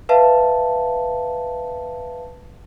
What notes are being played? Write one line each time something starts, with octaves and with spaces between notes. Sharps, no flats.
B4 E5 F5 A5